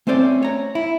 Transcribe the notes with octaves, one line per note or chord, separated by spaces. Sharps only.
A3 C4 C#4 C5 D5
C#5 A#5
E4